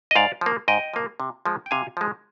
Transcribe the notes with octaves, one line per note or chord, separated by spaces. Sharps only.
D#5
G#2 D5 F5
F3 A#3
G#2 D#5 G5
F3 A#3
C3
F3 G#3
G5
C3 F5 G#5
F3 G#3